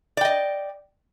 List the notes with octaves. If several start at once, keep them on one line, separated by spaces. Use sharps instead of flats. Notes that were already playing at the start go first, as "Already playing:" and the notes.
D5 D#5 G5